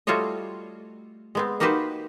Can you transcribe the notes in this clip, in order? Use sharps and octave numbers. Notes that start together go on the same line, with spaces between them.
G3 A3 F4 F#4 C#5 D#5
G#3 B3 C4
A#3 D#4 F#4 G4 B4 C5